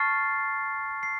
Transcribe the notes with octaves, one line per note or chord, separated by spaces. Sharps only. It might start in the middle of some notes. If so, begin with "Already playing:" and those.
Already playing: A5 C#6 F6 A6 C7
C7